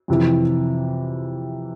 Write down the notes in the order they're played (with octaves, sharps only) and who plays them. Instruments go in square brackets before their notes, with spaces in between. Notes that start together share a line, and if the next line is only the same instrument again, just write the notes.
[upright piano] F2 C3 E3